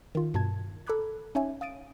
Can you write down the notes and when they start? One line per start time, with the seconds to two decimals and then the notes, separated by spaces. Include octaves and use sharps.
0.15 D#3 F4
0.34 G2 B2 A5 G#6
0.87 A4 A#5 B5 D6 F#6 G#6
1.35 C#4 D#4 C#5 E5 G#5
1.61 F5 D#6 A6 D7 D#7